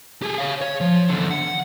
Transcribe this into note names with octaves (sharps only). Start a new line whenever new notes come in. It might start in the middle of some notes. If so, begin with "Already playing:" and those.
G4 G#4
C#5 F5
C#5
F3
E2 D3
F#5